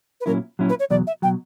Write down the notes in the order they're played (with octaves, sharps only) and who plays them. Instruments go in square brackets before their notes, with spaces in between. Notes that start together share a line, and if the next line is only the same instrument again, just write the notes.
[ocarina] B4
[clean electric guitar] A#2 F#3 C#4 E4 [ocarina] A#4
[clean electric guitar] A#2 F#3 C#4 E4
[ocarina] B4
C#5
[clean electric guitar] E2 B2 F#3 [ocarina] D5
[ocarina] E5
[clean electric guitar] B2 F#3 [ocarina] G5